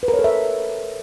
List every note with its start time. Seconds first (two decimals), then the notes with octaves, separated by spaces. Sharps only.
0.03 B4
0.08 A#4
0.14 C#5
0.19 A4
0.24 E5